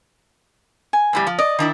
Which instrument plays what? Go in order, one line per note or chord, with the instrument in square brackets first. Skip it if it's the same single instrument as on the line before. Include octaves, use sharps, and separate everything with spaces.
[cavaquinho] G#5
[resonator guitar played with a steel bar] F2 A2 G3
F3
[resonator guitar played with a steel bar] D5 [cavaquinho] D#5
[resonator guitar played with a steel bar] D#3 D4 E4